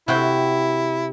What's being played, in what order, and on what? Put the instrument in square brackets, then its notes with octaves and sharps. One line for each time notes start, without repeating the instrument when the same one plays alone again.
[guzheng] C3 F#4 G5 [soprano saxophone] E4